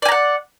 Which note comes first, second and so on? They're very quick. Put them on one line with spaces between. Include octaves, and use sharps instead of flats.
D5 G#5 A#5 F#5